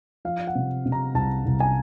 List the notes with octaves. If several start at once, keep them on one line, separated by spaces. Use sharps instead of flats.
F3 F5
F#5
C3
C3
A#5
C2 A5
C2
G#5